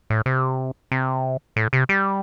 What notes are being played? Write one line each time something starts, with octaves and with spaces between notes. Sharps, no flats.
A2
C3
C3
A2
C3
G3